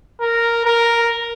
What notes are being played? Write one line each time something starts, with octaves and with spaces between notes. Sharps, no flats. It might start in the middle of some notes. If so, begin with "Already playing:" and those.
A#4
A#4